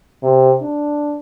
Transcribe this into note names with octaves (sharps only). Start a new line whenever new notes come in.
C3
D4